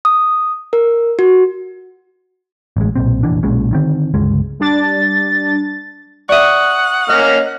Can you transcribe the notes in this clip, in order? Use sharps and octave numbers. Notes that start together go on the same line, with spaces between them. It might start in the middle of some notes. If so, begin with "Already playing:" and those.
D#6
A#4
F#4
A1 G#3
B1 A#2 C4
F1 A#1 E3 D4
B1 A#2 G#3 C#4
D3 D#3 C4
G1 C#2 G#3
G3 D4 A6
D5 E5 F#5 C#6 D#6
A#3 C#4 D#5 F6